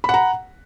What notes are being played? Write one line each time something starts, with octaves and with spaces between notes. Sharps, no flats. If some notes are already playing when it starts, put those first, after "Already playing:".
F#5 A#5 B5